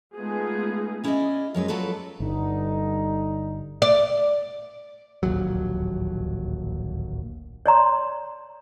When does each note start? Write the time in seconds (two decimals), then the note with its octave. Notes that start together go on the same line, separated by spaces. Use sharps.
0.15 G#3 A3 B3 D#4 F4 G#4
1.04 C#4 E4 G#4 C5 D5 D#5
1.54 F#2 F#3 G#3 B4
1.68 F#3 F4 F#4 A4 B4 D5
2.20 G1 G2 D3 D#4
3.82 D5
5.23 D1 A#1 D#2 F#3
7.66 C#5 D5 A#5 C6